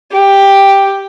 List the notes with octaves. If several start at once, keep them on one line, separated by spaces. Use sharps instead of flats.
G4